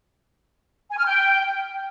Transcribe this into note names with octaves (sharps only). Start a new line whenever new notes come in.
G#5
F6
G5